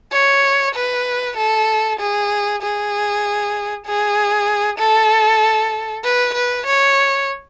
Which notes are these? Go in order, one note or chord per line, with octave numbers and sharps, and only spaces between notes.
C#5
B4
A4
G#4
G#4
G#4
A4
B4
B4
C#5